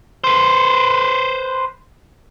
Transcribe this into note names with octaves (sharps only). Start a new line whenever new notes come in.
B4 C5